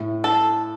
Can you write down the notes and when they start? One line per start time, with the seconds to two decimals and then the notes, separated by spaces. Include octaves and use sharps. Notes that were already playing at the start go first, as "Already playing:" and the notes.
Already playing: A2
0.24 A4